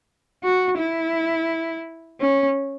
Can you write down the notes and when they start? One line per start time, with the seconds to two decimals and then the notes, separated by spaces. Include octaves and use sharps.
0.44 F#4
0.78 E4
2.20 C#4